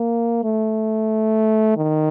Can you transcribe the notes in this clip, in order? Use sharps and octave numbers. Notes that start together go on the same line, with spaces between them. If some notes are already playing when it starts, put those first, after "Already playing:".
Already playing: A#3
A3
D#3